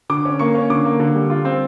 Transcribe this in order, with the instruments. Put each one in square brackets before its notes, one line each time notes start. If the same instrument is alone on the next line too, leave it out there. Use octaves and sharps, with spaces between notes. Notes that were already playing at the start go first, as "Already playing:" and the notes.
[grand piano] D3 D6
C#4
A#3 C#6
C#4
D3 D6
A#3
D3
G3
F4
C4